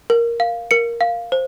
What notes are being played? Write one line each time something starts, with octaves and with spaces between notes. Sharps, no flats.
A#4
F5
A#4 C#7
F5
C5